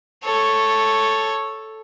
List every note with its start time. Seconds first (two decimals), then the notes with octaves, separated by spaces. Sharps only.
0.24 A4 C#5